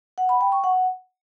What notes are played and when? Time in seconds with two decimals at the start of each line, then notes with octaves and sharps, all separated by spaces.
0.18 F#5
0.29 B5
0.41 G5
0.52 C#6
0.64 F#5